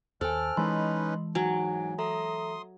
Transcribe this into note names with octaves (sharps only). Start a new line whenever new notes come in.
D#2 A4 C5 G#5 F6
E3 G#3 C#4 D#4 B4 D#5 B5 C6
G#2 F#3 G#5
A4 E5 A#5 C6 D#6